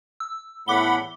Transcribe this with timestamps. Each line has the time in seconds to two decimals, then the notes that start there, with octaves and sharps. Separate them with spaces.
0.20 E6
0.68 E2 A2 F#5 B5 D6 G7